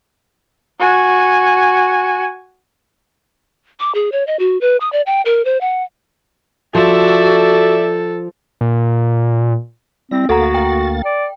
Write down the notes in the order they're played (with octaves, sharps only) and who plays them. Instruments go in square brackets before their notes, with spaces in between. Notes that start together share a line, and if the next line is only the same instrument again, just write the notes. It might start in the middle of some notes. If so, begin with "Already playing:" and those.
[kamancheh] F#4 G#5
[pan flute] D6
G#4
C#5
D#5
F#4
B4
D#6
D5
G5
A#4
C5
F#5
[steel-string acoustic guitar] F3 [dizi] F#4 [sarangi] A4 [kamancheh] D5 E5
[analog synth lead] A#2
[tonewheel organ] G3 E4 A#6 [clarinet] C4
[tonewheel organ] D2 A#3 A6 [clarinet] F#4 [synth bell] A4 F#5 A#5
[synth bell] G5
[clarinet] D5